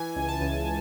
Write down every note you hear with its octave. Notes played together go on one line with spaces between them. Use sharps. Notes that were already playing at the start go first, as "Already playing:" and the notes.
Already playing: E3 G#5
C#2
A5
C#2